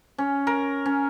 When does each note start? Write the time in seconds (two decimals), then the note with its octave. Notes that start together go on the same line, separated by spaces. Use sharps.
0.18 C#4
0.47 A#4
0.86 C#4